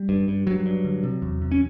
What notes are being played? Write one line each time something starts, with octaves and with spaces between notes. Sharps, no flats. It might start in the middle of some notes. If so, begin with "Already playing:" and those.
Already playing: G3
G2
G2
G2 F#3
G2
D3
C3
E2
C3
C#4